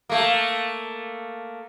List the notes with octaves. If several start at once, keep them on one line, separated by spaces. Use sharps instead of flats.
A3 A#3